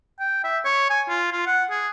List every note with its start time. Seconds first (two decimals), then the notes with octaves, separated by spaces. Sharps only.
0.19 G5
0.44 E5
0.65 C#5
0.90 G#5
1.09 F4
1.32 F4
1.46 F#5
1.70 G#4